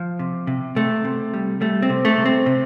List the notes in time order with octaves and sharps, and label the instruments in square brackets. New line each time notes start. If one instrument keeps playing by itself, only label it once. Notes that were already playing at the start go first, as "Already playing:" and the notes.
Already playing: [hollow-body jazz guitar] F3
C3
C3
C3 A3
C3
G3
G3 A3
C4
C3
A3
C3
C4
C3